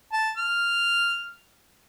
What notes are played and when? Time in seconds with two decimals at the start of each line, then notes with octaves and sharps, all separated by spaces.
0.13 A5
0.37 F6